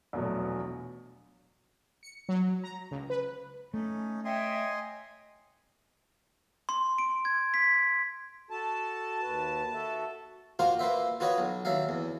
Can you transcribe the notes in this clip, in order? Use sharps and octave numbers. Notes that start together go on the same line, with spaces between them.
A#1 E2 B2 F#3 A3
C#7
F#3
A#5
C#2
B4
A3 C#4 D#4
C#5 D#5 E5 G5 G#5 C6
C6
D7
G#6
B6
F#4 A4 A5
D#2 F#4 B4
F#4 A4 E5
A#3 F4 F#4 A#4 C5 F5
A#3 B4 C5 E5
F4 F#4 B4 C#5 D#5
B1
D#2 F#3 E5 F5
E2